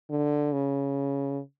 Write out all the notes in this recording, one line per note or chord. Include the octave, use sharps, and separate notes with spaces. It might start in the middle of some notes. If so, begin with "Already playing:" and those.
D3
C#3